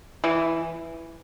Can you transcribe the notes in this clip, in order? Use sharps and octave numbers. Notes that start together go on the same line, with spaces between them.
E3